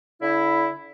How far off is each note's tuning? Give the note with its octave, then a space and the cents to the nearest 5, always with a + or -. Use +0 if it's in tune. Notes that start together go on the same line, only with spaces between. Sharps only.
D3 -35 E4 +0